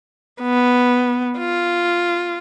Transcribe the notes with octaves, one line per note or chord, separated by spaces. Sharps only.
B3
F4